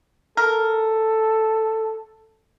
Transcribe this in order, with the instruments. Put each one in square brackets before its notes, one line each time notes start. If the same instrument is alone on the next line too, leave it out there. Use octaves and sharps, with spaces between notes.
[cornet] A4 [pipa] A#4